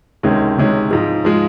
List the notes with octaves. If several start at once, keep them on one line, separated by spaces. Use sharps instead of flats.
C#2 C3 D#3 G#3 C#4
C#2 C3 D#3 G#3 C#4
G#2 F3 G#3
F3 G#3